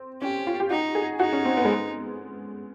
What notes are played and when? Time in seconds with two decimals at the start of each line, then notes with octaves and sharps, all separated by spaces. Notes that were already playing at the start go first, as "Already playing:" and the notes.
Already playing: C4
0.21 C#4 G4
0.47 F4
0.60 G4
0.70 D#4 F#4
0.95 G#4
1.20 D#4 F#4
1.33 C#4
1.45 C4
1.57 B3
1.65 G#3